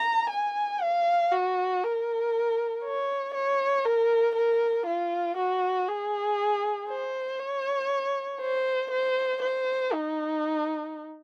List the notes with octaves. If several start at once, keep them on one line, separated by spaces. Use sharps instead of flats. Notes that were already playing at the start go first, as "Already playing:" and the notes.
Already playing: A#5
G#5
F5
F#4
A#4
C#5
C#5
A#4
A#4
F4
F#4
G#4
C5
C#5
C5
C5
C5
D#4